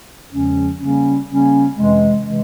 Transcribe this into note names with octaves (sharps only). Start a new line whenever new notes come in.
E2 C#3 F3 G#3 C#4
C#3 G3 A#3 C#4
C#3 G3 A#3 C#4
F2 C3 E3 G#3
C3 E3 G#3